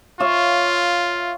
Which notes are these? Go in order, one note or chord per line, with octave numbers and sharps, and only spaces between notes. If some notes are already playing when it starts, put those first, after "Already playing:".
F4 C#5 E5 F5